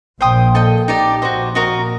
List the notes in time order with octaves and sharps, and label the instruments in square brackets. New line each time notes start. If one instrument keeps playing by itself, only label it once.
[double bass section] A#1 A#2 [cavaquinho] C5 G5 C6 D#6
[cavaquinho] A4 D#5 G5
D#4 G4 D5
[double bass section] A#1 A#2 [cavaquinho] F#4 C5 D#5
[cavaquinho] F#4 A#4 D#5